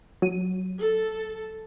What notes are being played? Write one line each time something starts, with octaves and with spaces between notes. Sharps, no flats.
F#3 D#7
A4